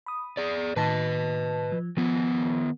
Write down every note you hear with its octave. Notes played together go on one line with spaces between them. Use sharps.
B5 D#6
G#4 D5
A2 D#3 B4 D#5 A5
F3
D#3 F3 B3